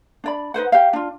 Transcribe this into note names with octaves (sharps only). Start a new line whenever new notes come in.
D4 D5 B5
D#4 B4 C5 F#5
G4 F5
D4 F4